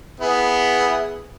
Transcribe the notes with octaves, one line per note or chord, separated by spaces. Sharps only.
B3 E4 G#4